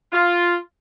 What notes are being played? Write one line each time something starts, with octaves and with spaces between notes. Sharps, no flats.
F4